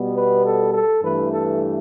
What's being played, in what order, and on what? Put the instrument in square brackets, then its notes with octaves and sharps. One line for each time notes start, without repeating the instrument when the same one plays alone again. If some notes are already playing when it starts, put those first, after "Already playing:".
Already playing: [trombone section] B2 G3 B3
B4
A4
A4
G2 E3 A3 B4
A4